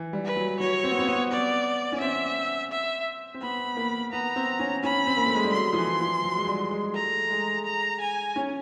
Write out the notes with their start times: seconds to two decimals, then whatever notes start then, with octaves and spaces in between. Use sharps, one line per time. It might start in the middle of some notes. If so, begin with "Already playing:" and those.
Already playing: E3
0.13 G3
0.25 B4
0.36 F#3
0.60 F#3 C#5
0.84 C4
0.91 B3
0.99 C4
1.07 B3
1.31 D5
1.92 C#4
2.01 C4 E5
2.72 E5
3.34 C4
3.42 B3 B5
3.77 A#3
4.13 B3 A#5
4.36 C4
4.59 C#4
4.83 C#4 B5
5.07 C4
5.17 A#3
5.26 A3
5.35 G#3
5.44 G3
5.53 F#3 C6
5.73 F3
5.78 E3
6.01 F3
6.24 F#3
6.37 G#3
6.47 G3
6.71 G#3
6.94 A3 A#5
7.30 G#3
7.65 A#5
8.01 G#5
8.36 C#4